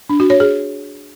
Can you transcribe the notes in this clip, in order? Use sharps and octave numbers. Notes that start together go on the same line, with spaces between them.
D4
F#4
C#5
G#4